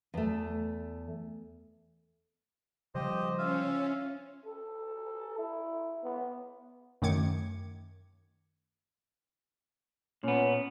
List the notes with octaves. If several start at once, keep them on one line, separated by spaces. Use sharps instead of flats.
E2 A3
C#3 F3 G3 G4 C5 D#5
C#4 F4 E5 F5
A4
E4
B3
F#2 D#3 A3 D6 G#6 C#7
A#2 B3 C#4